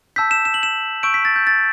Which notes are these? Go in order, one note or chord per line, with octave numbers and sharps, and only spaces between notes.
A5 E6 G6 B6
E7
E7
F#7
E7
C#6 E6 G6 D7
B6
A6
G6
A6